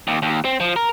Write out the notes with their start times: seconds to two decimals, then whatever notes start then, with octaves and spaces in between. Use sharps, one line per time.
0.08 D#2
0.22 D#2
0.45 C4
0.60 F3
0.76 A#4